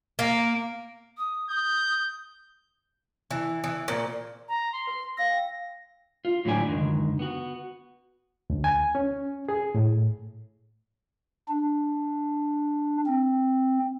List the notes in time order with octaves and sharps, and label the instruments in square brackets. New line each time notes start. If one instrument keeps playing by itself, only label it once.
[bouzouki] A#3
[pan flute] D#6
[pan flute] D#6 [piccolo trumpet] G6
[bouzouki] E3
E3
A#2
[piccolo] A#5
C6
[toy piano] B4
[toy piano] D#5 F5 E6 [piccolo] A#6
[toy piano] G5
[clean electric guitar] F4
A2 D3 F#3 G4 D5 G#5
C#2 F#2 D3 D#3
B3 F#4
[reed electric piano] D2
G#5
C#4
G#4
A2
[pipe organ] D4
C4